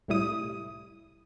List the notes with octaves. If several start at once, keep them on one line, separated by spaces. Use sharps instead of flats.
C2 A2 G3 E4 D#6